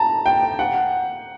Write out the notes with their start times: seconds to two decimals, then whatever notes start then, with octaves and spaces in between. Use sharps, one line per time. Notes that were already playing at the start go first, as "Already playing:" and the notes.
Already playing: A5 A#5
0.26 G5
0.59 F#5